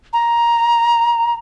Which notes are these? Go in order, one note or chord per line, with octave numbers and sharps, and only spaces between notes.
A#5